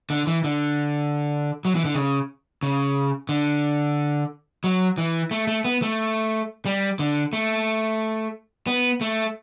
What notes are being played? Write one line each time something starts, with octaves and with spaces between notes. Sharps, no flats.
D3
E3
D3
F#3
E3
D3
C#3
C#3
D3
F#3
E3
A3
A3
B3
A3
G3
D3
A3
B3
A3